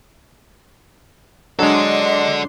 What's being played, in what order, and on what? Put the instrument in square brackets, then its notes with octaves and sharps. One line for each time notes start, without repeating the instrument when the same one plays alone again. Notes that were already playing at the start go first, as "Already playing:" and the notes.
[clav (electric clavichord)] F#3 G#3 [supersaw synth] D4 C6 C7 [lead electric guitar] A4 D5 [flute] D#5